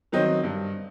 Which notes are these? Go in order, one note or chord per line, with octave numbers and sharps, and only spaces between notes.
D#3 F#3 C4 D#4
G2